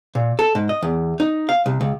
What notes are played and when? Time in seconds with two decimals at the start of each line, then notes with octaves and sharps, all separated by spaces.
0.15 A#2
0.39 A4
0.55 G#2
0.69 D#5
0.83 E2
1.20 D#4
1.49 F5
1.66 C2
1.81 C#2